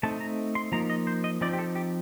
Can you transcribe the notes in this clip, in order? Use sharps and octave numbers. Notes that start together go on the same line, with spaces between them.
A3 C4 D#4 A5
A#5
C6
F3 A#3 D#4 A#5
D#5
C5
D#5
F3 C4 D#4 D5
G4
A4
G4